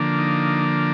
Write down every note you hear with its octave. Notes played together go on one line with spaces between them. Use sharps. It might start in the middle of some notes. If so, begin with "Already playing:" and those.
Already playing: D3 F3 A#3 D4
D#4